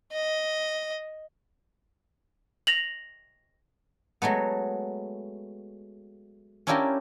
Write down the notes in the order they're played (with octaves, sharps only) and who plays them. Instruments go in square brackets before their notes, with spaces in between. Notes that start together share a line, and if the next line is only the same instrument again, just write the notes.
[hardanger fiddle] D#5
[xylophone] A#6 F7 F#7
[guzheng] F#3 G#3 A3 B3
C#4 D4 E4 F4 G4 A#4